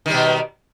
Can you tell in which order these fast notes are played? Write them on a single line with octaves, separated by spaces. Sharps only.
D#3 G3 B2